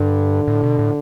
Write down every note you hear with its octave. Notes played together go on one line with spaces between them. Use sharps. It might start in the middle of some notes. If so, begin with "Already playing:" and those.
Already playing: G2 D3
A2
B2
A2